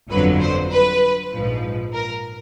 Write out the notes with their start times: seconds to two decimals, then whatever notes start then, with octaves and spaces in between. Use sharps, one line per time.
0.10 G1 F2 D3 F#3 B4
0.41 C5
0.72 B4
1.32 A#1 G#2 F3
1.93 A#4